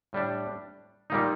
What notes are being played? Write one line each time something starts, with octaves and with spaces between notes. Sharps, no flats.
A2 G3 D4
A#2 G3 A#3 D#4